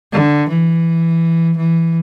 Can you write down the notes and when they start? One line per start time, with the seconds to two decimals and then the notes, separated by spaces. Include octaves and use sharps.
0.13 D3
0.49 E3
1.57 E3